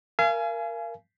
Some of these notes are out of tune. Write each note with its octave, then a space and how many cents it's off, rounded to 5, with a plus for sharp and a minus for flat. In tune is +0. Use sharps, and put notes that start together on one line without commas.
A#4 +0 F5 -35 G#5 +20